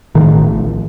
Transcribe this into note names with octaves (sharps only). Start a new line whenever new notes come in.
A2 D#3
A#1
A#1